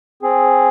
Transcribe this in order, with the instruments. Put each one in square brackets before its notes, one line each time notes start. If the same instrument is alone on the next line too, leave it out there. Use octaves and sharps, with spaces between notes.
[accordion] C4 G#4